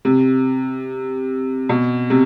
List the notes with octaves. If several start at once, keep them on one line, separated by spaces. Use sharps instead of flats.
C3
B2
C3